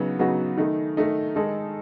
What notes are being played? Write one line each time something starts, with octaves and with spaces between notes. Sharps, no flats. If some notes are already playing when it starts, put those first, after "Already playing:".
Already playing: C#3 F#3 B3 D#4 F#4
C#3 F#3 B3 D#4 F#4
D#3 A3 D#4
D#3 A3 D#4
D#3 G#3 D#4 A4